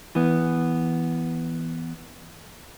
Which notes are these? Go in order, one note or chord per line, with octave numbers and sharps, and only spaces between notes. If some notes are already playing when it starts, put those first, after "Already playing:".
E3 B3